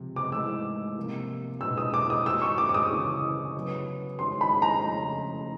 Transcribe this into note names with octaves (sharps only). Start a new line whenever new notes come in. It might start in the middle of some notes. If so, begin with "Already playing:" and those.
Already playing: C#2 C3 F3
D6
G#2 E3 A3 E6
C3 F3 A#3
B2 G#3 B3 D4 F4 E6
D#6
D6
D#6
D#3 G#3 C#4 F#4 E6
C#6
D6
D6
D#6
D2 C#3 E3
C#3 F#3 B3
D#3 G#3 C#4 F#4 C6
B5
A#5
F2 C#3 F3 A3 C#4